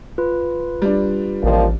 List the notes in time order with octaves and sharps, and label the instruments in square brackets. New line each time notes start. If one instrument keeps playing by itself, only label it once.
[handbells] F4 B4
[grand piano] G3 D4
[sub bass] A1 [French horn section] A#2 D#3 F3